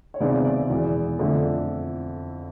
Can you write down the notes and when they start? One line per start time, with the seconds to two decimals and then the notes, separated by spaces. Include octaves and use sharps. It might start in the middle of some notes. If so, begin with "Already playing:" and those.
0.14 C#5
0.20 C#2 C3 D#3 G#3 B3 D5
0.45 D5
0.69 E2 B2 G#3
1.19 F2 D3 F3 A3